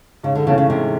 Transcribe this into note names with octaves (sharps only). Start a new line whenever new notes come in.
G#2 C#3
D3
C#3 E3 A3 C#4
C#3
G#2 C3